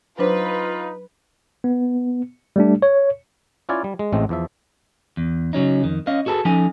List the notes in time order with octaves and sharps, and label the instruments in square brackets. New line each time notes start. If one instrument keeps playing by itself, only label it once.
[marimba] F#3 D4 C5 [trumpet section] D#4 F4 [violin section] B4
[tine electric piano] B3
G3 A3 D4
C#5
[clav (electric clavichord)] C#4 E4 F4 C#5 D5 G#5
G3
G#3
A1 A2 G#3 A3 C4
E2 F3 E5
[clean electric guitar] E2
C#3 F#3 C#4 D#4
F2 D#3
C#4 D#5 F5
F#4 G#4 A4 B4 A5
F3 C#4 D#4 A4 G#5